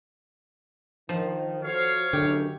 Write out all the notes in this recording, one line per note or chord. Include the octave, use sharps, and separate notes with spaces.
D#3 F3
F#4 A4 C5 C#5 F5
F#1 B1 F#2 D3 G4